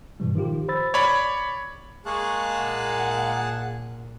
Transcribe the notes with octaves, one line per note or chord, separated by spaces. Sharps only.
G2 B2 E3 G3
D#3 F3 F4 G4
C5 B5 E6 A6
C#5 D5 B5
G#3 A#3 G#4 F5 A5 C#6 F#6
A#2 F#5